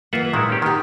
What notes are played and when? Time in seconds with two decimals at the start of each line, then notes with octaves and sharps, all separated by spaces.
0.13 E3 A#3 F4 E5 F#5
0.33 A#2 D#3 G#3 E4
0.50 C#4 G4
0.62 D#3 F#4 G4